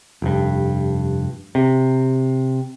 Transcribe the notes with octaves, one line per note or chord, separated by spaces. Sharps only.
F1 G2
C3